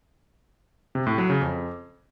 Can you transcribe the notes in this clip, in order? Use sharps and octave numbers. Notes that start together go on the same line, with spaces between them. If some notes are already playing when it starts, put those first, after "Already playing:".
C3
A2
F#3
C#3
F2